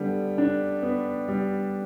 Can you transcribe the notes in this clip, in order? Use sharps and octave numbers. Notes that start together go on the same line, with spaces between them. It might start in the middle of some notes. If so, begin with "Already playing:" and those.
Already playing: D3 G3 B3
D4
B3
G3